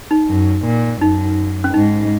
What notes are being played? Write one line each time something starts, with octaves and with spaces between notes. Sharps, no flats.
D#4
F#2
A#2
F#2 D#4
C#4
G#2 D#4